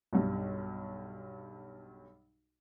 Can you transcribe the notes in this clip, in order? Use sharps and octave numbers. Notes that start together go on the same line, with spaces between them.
B1 G2